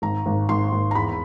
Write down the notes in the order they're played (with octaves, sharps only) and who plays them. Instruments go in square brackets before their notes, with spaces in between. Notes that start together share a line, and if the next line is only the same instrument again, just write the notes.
[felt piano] G#1 A#5
G#1
G#1 C6
G#1
A#5
E2 B5